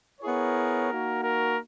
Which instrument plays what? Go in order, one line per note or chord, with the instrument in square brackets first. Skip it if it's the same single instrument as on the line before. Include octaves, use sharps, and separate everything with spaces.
[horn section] B3 E4 G#4 C#5 [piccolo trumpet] A#4
[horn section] A#3 D#4 F#4
[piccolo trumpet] A#4